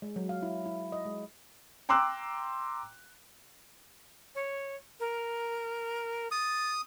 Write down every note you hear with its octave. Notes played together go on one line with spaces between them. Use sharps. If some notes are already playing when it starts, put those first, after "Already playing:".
G#3
F#3
F5
E4
E4
D#5
G#3
G5 A#5 C6 D6 E6 F#6
C#5
A#4
D#6 A6